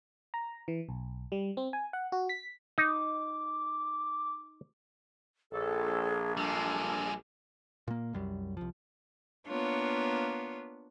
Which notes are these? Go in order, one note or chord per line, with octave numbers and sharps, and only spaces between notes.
A#5
E3
B1
G3
C4
G#5
F#5
F#4
B6
D#4 D6
A#1 G#4 A4
G3 G#3 D4 F4 A4 A5
A#2 A#3
C2 F#2 G3
C2 F3
A#3 B3 D4 F4 C#5